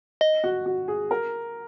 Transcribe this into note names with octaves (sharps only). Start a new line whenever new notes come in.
D#5
F#4
F#4
G#4
A#4